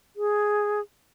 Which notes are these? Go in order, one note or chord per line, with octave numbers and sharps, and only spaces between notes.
G#4